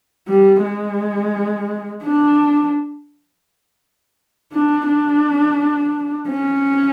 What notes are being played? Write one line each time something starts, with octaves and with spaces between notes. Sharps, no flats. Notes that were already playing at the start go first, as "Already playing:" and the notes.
G3
G#3
D4
D4
D4
C#4